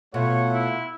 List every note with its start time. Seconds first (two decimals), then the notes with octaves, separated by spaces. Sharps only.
0.14 B2 A3 F4 C#5 F#5
0.51 E4